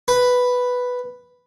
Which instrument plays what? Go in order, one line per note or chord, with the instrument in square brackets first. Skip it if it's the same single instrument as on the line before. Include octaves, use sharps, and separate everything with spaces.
[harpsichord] B4